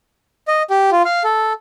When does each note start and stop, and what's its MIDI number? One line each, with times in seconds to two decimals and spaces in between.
0.48 0.62 75
0.70 0.90 67
0.92 1.02 65
1.05 1.23 77
1.24 1.53 69